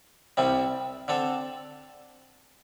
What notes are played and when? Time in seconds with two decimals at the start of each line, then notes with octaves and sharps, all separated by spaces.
0.37 C2 C3 G3 C4
1.08 D3 C4 A4